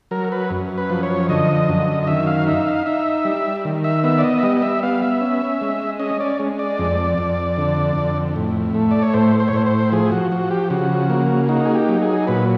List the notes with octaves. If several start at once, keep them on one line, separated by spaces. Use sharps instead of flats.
F#3 A#4
B4
F#2
B4
F3
C#5
D3 D#5
F#2
D#5
D#3 E5
F5
D#4 E5
F5
D#4 E5
G3
D#3
E5
B3 E5
D5
D#5
E5
G3 D#5
D#5
E5
B3 F5
E5
C#4
G#3
C#4 D#5
D5
G#3
D5
F2
F2
D3
F2
A2
A3
D5
C#5
A2 C5
C5
C#5
A2 C5
C5
F3 G#4
F#4
F3 F#4
G4
C#3 F#4
A#3
D#4 F#4
G#4
G4
F#3
G#4
A#2 B4